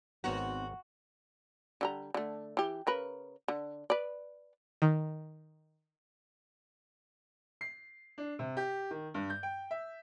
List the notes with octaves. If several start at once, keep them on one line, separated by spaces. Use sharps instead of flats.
G#1 B3 C4 D#4 F#4 C#5 A#5
D3 G3 A#5
D3 A3
E3 G4
C#3 A#4 B4
D3
B4 D5
D#3
C7
D4
C3
G4
D#3
G2
G6
G5
E5